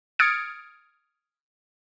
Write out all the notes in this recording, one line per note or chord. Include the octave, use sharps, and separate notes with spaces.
D#6 F6 G#6 A6 C#7 D7